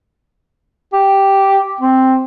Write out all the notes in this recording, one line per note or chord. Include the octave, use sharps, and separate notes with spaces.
G4
C4